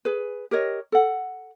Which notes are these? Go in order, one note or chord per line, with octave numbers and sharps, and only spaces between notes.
G#4 B4
G4 A#4 C#5 D#5
A4 F#5